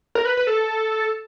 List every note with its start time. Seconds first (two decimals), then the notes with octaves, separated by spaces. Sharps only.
0.15 A#4
0.25 B4
0.37 B4
0.47 A4